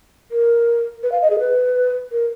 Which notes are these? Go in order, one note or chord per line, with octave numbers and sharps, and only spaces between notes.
A#4
B4
F5
D#5
G#4
B4
A#4